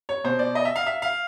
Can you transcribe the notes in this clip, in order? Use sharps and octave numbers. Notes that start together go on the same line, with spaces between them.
C#5
B2 C5
D5
D#5
E5
F5
E5
F5